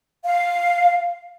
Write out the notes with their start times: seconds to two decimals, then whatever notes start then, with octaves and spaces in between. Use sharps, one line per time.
0.24 F5